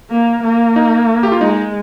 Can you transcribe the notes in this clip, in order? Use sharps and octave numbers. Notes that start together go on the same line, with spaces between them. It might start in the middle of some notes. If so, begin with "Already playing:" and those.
A#3
A#3
D#4
G4
F4
G#3 D#4